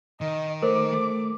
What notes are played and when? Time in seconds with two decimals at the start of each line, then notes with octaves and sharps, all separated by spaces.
0.21 D#3 D#5
0.62 A3 A#4 C5 D6
0.92 A3